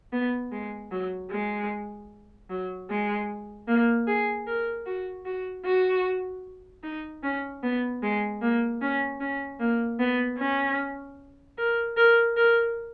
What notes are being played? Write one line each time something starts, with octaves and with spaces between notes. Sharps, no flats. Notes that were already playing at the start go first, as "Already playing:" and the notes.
B3
G#3
F#3
G#3
F#3
G#3
A#3
G#4
A#4
F#4
F#4
F#4
D#4
C#4
B3
G#3
A#3
C#4
C#4
A#3
B3
C#4
A#4
A#4
A#4